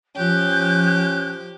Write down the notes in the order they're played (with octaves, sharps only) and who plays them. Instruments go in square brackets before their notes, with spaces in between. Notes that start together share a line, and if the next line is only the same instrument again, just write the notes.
[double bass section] F3 [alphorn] C#4 [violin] G4 [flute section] F#6 G6